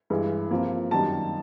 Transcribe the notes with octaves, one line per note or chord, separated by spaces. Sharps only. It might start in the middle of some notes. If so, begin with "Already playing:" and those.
G2 E3 G#3
C3 F3 A#3
F#2 D#3 G3 A#3 A5